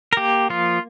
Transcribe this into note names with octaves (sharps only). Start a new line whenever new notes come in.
A#4
A#3 G4
F3 F4